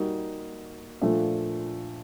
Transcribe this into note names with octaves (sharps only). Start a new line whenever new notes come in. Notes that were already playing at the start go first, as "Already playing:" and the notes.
Already playing: G3 A#3 D#4 F#4
A#2 F3 A3 D4 F4